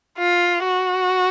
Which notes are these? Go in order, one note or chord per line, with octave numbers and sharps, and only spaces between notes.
F4
F#4